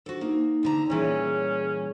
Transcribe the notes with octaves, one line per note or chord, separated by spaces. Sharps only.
D4 F#4 A4 C5
A#3 D#4
D2 D3 A#5
A#2 E3 G3 C#4 G#4 C#5